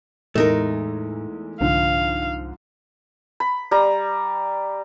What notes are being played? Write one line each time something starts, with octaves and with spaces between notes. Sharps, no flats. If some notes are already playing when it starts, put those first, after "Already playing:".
E2 A2 G#3 A3 D#4 A#4
C2 G#2 D3 F3 F5
B5
G3 A#5